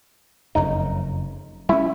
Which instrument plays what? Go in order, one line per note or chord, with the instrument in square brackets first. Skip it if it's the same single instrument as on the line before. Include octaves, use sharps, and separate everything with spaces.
[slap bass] F#1 F2 C#3 [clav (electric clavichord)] D#4
[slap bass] G3 C#4 [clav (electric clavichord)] E4